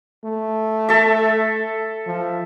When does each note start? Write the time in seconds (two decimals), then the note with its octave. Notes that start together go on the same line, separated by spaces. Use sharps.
0.24 A3
0.89 A4 E5
2.07 F3